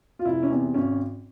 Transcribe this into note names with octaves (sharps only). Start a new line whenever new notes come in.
F4
F1 E4
C#4
E2 C3 C4
G#1 C#4